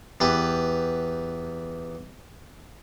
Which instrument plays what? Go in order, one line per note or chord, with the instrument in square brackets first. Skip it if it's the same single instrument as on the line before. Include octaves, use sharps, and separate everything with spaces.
[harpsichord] E2 G4 B4